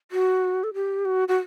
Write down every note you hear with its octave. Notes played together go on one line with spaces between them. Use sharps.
F#4
A4
G4
F#4
F#4